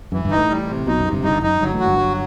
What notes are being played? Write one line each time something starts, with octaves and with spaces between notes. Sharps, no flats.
F#2 E3
G1 G2
D#4
A1 A2
G3
C3
B1 B2 D#4
F#2
C3
G1 G2
G1 G2 D#4
F#2 D#4
G1 G2 F#3
A1 A2
F#4
G1 G2
F#3